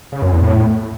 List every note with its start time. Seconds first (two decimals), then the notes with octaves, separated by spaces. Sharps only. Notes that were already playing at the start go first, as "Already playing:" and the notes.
0.12 C#3
0.22 F#2
0.32 E2
0.42 A2